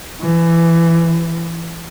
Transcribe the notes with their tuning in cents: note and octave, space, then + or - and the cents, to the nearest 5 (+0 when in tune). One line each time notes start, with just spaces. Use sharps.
E3 +20